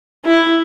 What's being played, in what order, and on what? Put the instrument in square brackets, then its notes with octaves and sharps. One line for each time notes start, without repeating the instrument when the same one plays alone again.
[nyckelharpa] E4